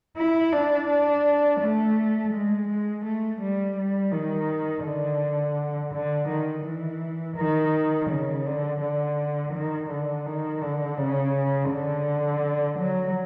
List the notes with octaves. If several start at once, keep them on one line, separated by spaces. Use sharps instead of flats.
E4
D4
D4
A3
G#3
G#3
A3
G3
G3
D#3
D3
D3
D#3
E3
D#3
C#3
D3
D3
D#3
D3
D#3
D3
C#3
D3
F#3